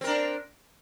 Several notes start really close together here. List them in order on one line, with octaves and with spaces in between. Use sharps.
C4 A#4 D4